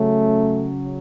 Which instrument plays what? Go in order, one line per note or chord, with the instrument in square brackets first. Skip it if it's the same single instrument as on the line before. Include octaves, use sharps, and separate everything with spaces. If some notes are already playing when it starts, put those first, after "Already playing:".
Already playing: [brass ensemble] C#3 F#3 C#4 [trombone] A3